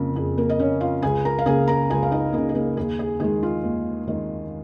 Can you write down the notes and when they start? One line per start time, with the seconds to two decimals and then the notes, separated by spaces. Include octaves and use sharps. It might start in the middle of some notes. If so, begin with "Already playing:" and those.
Already playing: F2 C#3 A#3
0.15 F2 G#4
0.38 A#3 A#4
0.50 D#5
0.59 C#3 A#3 C#4 C#5
0.81 F4 F5
1.02 C#2 G#4 G#5
1.25 A#4 A#5
1.39 F5
1.46 C#3 A#3 G#4 G#5
1.68 A#4 A#5
1.90 C#2 G#4 G#5
2.03 F5
2.11 D#4 D#5
2.33 C#3 A#3 G#4
2.49 G#4
2.55 A#3 A#4
2.77 D#2 G#4
2.99 G#4
3.20 D#3 G#3 G#4
3.43 F4
3.64 D#2
4.08 D#3 G#3